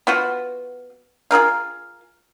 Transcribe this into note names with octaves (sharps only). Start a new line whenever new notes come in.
B3 F4 F#4
F4 G#4 A#4 F5